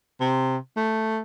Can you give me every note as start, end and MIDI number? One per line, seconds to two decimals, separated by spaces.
0.21 0.57 48
0.77 1.20 57